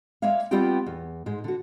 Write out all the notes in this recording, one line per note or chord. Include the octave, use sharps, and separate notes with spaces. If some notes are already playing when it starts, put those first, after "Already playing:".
G#3 A#3 C#5 E5 F5
G3 B3 C4 F4 G4 G5
E2
G#2 G#3
D3 F#4